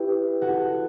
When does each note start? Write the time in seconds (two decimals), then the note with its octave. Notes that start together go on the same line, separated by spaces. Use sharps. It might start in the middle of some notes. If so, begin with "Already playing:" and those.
Already playing: E4 G4 B4
0.42 F#4 A4